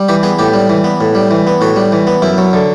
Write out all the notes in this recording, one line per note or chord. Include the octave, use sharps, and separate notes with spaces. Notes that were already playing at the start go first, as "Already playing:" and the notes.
Already playing: G3
E3 G4
B3 G#4
A2 G4
G3
E3
B3
A2
G3
E3
B3
A2 F#4
G3
E3
B3
F#2 E4
F#3
D3